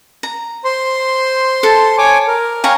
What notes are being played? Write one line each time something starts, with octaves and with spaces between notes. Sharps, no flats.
A#5
C5 C6
A4 A5
C#5 G#5 D6
A#4
C#5 F5 G5 G#5 A#5